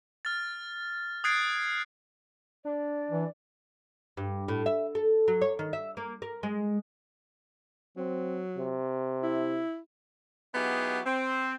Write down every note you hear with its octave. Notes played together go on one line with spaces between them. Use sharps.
F6 A6
D#6 F#6 G#6 A6 C7 D7
D4 D5
E3
G2
A2
E5
A4
F#3
C#5
D#3
E5
A#3
A#4
G#3
F#3 C4
C3
E4
F#3 B3 D#4 E4 G4 G#4
C4